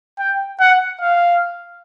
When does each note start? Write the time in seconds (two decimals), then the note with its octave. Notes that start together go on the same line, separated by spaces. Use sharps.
0.19 G5
0.60 F#5
1.01 F5